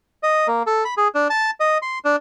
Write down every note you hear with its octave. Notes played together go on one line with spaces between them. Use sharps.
D#5
A#3
A4
B5
G#4
D4
A5
D#5
C6
D4